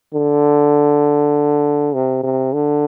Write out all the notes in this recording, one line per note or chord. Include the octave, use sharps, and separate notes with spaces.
D3
C3
C3
D3